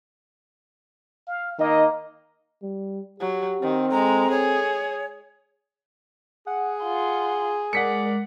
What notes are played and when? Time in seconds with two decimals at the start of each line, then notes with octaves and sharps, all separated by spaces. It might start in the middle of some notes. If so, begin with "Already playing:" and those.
1.28 F5
1.59 D#3 A#3 D#4 D#5
2.63 G3
3.20 F#3 G4
3.62 D#3 C4
3.91 G#3 A4 A#5
4.31 G#4 C#5
6.47 G#4 F#5
6.82 F4 C6
7.73 G#3 A#4 D5 F#5 B6 C#7